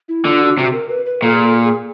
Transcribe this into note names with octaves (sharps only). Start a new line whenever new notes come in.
E4
D3 F4
F#4
C3 F#4
A#4
B4
B4
A#2 A4
G#4
A4
G#4